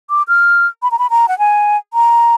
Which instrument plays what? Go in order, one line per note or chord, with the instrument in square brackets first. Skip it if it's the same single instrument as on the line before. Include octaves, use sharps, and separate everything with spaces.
[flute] D6
F6
B5
A#5
B5
A#5
F#5
G#5
A#5